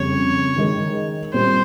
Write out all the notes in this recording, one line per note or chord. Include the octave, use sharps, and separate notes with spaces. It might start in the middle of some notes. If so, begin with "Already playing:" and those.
Already playing: F2 C#3 G3 C#5
D#3 G#3 D#4 A#4
A#2 G3 C4 C5